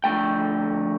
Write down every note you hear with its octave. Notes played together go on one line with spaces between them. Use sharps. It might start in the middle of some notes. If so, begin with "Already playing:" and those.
F2 D3 A3 G5